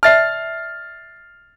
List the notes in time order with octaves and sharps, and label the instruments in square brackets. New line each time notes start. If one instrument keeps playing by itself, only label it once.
[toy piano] D5 E5 A5 [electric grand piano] F6 A6 C7